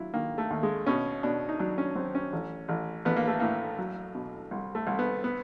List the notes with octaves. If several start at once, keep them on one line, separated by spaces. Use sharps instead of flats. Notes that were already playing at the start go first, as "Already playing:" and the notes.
Already playing: F#3 E4 F4
D#3 A#3
A3
D#2
G#3
B2 C#4
B2 D4
D#4
F#3 D4
C#4
F#3 C4
C#4
A1
A1
A1 B3
A#3
A3
A2 A#3
F#3
B2
C2
A3
C2
B3
B3